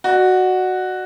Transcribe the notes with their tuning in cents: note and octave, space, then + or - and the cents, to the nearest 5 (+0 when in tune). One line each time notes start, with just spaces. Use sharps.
F#4 +0 D5 +40